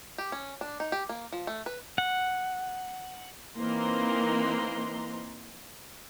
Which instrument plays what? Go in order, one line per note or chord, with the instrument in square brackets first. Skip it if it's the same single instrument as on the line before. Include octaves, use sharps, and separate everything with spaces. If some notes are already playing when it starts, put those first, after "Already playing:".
[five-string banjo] G4
C#4
D4
D#4
G4
A#3
F3
A3
B4
[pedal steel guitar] F#5
[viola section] E3 A#3 C4 D#4 A#5 C6